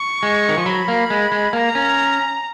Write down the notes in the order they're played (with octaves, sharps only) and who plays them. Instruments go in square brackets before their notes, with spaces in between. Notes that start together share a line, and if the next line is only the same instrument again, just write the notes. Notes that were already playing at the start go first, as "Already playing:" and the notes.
Already playing: [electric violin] C#6
[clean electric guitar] G#3
D#3
F3
[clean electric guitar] F#3 [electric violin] B5
[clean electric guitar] A#3
G#3
G#3
[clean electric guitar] A#3 [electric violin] A#5
[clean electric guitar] C#4